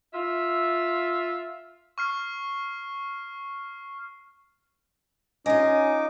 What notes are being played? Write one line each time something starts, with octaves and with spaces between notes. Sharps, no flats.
F4 E5
C#6 F6 C7
C#4 D#4 F4 D#5 G#5 D6